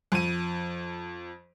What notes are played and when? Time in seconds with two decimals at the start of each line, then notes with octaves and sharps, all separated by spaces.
0.12 F2 D#7